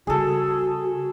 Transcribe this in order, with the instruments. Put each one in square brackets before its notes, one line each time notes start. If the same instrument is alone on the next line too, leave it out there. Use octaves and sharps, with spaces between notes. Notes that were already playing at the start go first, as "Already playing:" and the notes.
[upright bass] C#3 G3 [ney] F#4 [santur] G#4 A4